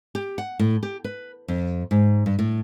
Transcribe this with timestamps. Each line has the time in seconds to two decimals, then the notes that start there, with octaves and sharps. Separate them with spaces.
0.15 G4
0.38 F#5
0.59 A2
0.83 G4
1.04 B4
1.48 F2
1.91 G#2
2.26 G2
2.39 A2